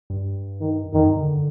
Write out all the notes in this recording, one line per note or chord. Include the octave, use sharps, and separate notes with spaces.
G2
D#3
F2 D#3
G2
D3